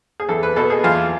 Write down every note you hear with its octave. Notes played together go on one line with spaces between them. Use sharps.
G#4
E2 A4
B4
B2 A4
G#4
E2 F4